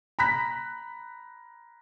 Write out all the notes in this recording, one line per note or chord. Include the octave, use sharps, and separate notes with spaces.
A#5 B5 F#6 B6